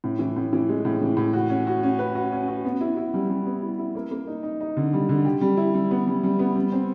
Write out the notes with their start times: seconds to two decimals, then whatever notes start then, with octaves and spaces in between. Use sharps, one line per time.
0.04 A2
0.19 E3
0.36 A2
0.53 E3
0.69 G#3
0.85 A2
1.01 E3
1.17 A2
1.33 F#4
1.50 C#4
1.67 F#4
1.83 C#4
1.99 B4
2.15 F#4
2.32 C#4
2.48 F#4
2.65 B3
2.81 E4
2.97 E4
3.14 G3
3.30 G3
3.46 B3
3.62 E4
3.78 E4
3.95 A#3
4.11 A#3
4.27 D#4
4.43 D#4
4.60 D#4
4.77 D3
4.93 G3
5.09 D3
5.25 G4
5.41 G3
5.57 E4
5.74 G3
5.91 B3
6.07 G3
6.23 G3
6.39 B3
6.56 G3
6.72 C4